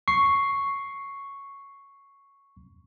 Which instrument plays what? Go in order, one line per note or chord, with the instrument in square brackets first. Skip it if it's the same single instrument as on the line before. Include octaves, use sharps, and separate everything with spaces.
[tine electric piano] C#6 C7